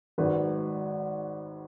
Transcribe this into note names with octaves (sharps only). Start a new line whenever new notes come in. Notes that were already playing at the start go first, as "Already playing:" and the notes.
G#1 G#2 D#3 F#3 B4